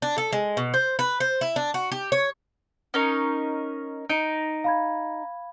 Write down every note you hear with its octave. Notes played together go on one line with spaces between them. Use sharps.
D4
A4
G#3
B2
C5
B4
C5
E4
D4
F#4
G4
C#5
C#4 D#4 A#4
D#4 D7 D#7
F5 B5 G#6